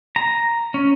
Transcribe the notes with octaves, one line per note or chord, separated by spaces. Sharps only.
A#5
C#4